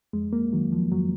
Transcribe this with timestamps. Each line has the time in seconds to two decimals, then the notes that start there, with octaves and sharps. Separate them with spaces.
0.13 F2 G#3
0.33 A#3
0.53 D#3 F#3
0.72 F3
0.91 F2 F#3